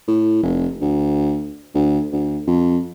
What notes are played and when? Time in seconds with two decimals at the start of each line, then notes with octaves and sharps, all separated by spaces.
0.08 A2
0.43 F1
0.81 D2
1.74 D2
2.12 D2
2.47 F2